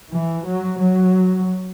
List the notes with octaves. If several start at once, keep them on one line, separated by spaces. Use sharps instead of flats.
E3
F#3
F#3